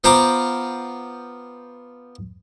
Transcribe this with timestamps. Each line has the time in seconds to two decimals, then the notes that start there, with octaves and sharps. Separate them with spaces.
0.04 B3 F4 C5 G5 A#5 D6